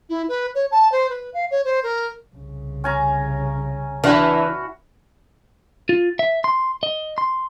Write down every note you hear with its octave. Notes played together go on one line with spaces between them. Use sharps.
E4
B4
C#5
A5
C5
B4
F5
C#5
C5
A#4
C2 C#3
C#4 G#5 A#5
E3 D4 E4 F#4 F5
F4
E5
C6
D#5
C6